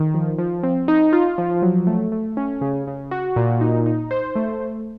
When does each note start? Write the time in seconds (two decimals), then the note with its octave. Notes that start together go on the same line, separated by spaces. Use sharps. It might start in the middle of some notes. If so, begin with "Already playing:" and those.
Already playing: D#3
0.14 F3
0.38 F3
0.63 C4
0.88 D#4
1.13 F4
1.38 F3
1.62 F#3
1.87 A3
2.12 A3
2.37 C#4
2.61 C#3
2.87 C#3
3.11 F#4
3.36 A#2
3.61 D#4
3.86 D#4
4.11 C5
4.36 A3
4.60 A3